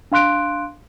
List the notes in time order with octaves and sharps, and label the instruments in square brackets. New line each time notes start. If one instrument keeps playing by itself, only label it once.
[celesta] D4 F5 C6 F#6 D7